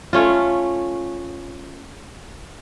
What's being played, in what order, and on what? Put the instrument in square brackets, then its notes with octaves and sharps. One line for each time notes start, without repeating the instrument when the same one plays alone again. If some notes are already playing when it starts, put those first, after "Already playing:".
[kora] A3 C#4 F4